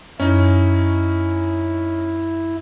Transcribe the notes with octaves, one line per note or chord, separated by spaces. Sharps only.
F#2 C#4 D#4 E4